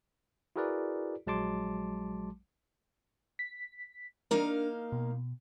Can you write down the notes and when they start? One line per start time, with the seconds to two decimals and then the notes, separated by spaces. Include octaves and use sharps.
0.56 E4 F#4 G#4 A#4 B4 D5
1.27 A#1 F#3 G#3 A5 C6 D6
3.39 B6
4.31 A#3 D4 D#4 A#4 F5
4.92 B2